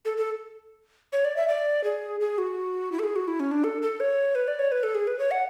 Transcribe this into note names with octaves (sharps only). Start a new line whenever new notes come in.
A4
A4
C#5
D5
E5
D5
G#4
G#4
F#4
E4
A4
G#4
F#4
E4
C#4
D4
A4
A4
C#5
B4
D5
C#5
B4
A4
G#4
B4
C#5
F#5